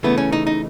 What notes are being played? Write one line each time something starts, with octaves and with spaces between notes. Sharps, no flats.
C#3 E3 A3 B3
C#4
D#4
D#4